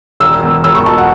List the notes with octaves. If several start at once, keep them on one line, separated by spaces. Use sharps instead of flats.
E1 E6
E2
E1 E6
C#6
B2 A5
F#5